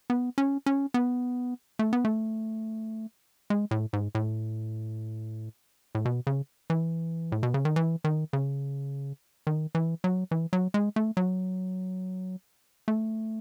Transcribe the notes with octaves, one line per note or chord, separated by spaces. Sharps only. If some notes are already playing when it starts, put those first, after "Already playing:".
B3
C#4
C#4
B3
A3
B3
A3
G#3
A2
G#2
A2
A2
B2
C#3
E3
A2
B2
C#3
D#3
E3
D#3
C#3
D#3
E3
F#3
E3
F#3
G#3
A3
F#3
A3